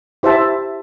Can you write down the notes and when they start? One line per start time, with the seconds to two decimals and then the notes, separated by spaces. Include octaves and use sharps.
0.23 E4 G4 C5 E5 A5